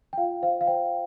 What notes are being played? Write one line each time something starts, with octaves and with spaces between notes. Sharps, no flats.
G5
F4 F5
C5 F5
F5
C5 G5